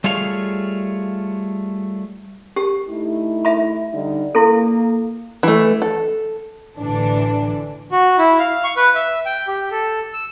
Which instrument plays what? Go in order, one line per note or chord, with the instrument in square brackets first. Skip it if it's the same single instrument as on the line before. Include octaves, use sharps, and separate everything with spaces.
[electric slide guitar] G3 A3 F4 G#4 C#5 F5
[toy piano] G4
[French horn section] A3 D#4 E4
[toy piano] E5 B5
[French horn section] D3 G3 D#4
[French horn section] A#3 [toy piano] E4 A4
[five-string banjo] E3 A3
A4
[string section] A1 D3 E3 D4
[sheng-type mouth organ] F#4
E4
F5
C#6
B4
E5
G5
G4
A4
E6